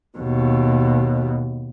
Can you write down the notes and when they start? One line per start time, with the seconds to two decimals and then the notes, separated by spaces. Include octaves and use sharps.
0.18 D#2 B2